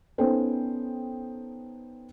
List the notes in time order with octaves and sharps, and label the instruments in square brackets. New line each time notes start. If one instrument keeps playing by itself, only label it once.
[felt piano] B3 C#4 D#4 A4 C5 G5